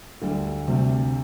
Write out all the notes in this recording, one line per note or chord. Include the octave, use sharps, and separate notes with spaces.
D2 D3 G3
D2 C3 G3